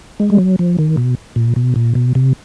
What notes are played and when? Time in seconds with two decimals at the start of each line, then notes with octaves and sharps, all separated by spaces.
0.20 G#3
0.30 G3
0.38 F#3
0.59 F3
0.79 D#3
0.97 B2
1.36 A#2
1.56 B2
1.76 A#2
1.95 B2
2.15 C3